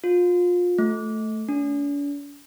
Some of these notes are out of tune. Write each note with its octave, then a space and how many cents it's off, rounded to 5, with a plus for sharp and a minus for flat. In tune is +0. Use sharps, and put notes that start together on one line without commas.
F4 +25
A3 -5
D4 -45